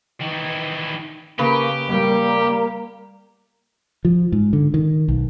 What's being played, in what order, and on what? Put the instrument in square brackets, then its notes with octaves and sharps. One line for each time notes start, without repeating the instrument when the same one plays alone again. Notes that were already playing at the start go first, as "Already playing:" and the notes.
[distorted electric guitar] D#3 E3
[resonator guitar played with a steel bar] C#3 B4 [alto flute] A#3 [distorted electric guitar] G4
[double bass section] G3 [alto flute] A#3
[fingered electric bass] F3
G#2
D3
D#3
B1